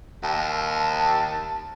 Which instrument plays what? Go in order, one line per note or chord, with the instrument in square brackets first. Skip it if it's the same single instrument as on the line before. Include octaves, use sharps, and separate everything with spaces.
[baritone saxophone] D#2 [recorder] A5